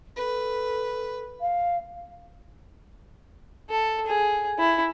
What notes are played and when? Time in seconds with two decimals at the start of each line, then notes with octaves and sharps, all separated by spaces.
0.16 A4 B4
1.40 F5
3.70 A4
4.06 G#4
4.59 E4